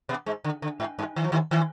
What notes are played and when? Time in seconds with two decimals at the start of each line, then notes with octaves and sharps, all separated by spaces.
0.09 B2 B3
0.26 G#2 G#3
0.44 D3
0.62 D3
0.80 G#2
0.99 G2
1.16 D#3
1.24 F3
1.32 D#2 D#3
1.51 D#3